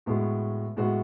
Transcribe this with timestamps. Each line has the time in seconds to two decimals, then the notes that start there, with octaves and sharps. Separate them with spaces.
0.06 A2 G#3 B3 F#4
0.76 A2 G#3 B3 F#4